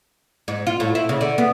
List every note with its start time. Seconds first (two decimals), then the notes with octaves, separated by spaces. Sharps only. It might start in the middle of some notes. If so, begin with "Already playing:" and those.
0.48 G#2
0.67 F4
0.80 A2
0.95 E4
1.09 C#3
1.21 D3
1.38 B3